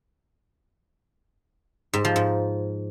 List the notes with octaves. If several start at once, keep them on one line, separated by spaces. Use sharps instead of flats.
G#2
F3
G#2